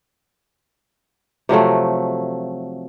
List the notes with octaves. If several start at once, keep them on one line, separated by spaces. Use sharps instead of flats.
C3 F3 F#3 A3